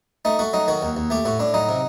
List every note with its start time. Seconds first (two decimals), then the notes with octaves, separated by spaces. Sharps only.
0.25 A3 D#4
0.39 A3 F#4
0.53 F#3 D#4
0.68 D#3 F#4
0.82 D#2
0.97 D#2
1.10 A3 G4
1.25 A2 F#4
1.39 A2 D4
1.54 F#3 D#4
1.69 C3